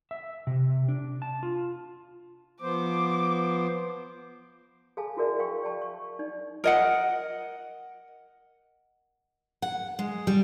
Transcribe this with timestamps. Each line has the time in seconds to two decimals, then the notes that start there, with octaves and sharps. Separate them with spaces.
0.11 E5
0.47 C3
0.88 D4
1.22 A5
1.43 F4
2.62 F3 B3 C5 D6
4.97 G#4 A4 F5 G#5 A5
5.17 E4 F#4 G#4 A#4 D5 E5
5.39 F5 G5 C#6
5.63 D5 F5 G5 A5 C#6
5.82 C#6
6.19 D#4 D5
6.64 A#4 D#5 F#5
9.62 F#5
9.99 G#3
10.27 G3